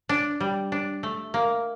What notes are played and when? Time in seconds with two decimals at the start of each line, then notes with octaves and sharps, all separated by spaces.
0.09 D4
0.40 G3
0.72 D4
1.03 A3
1.34 A#3